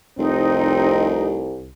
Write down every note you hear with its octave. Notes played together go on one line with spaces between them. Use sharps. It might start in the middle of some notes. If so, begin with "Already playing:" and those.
F1 C2 C4 D#4